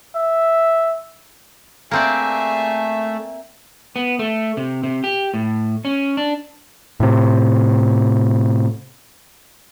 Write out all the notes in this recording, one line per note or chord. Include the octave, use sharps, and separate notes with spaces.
E5
A3 A#3 C4 G#4 D5 E5
B3
A3
C3
C3
G4
A2
C#4
D4
A2 C3